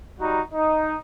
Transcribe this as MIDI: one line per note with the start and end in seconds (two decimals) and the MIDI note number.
0.19 0.41 55
0.19 0.41 63
0.19 0.41 66
0.19 0.41 82
0.53 0.96 63